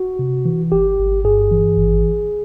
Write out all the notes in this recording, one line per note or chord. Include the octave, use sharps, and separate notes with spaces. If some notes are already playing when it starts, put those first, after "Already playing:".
Already playing: F#4
C3
E3
G1 G4
G1
G2 G#4
E3
G#1